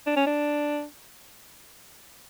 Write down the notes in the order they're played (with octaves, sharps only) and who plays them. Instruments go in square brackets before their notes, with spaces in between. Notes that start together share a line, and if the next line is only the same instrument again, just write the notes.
[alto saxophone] D4
C#4
D4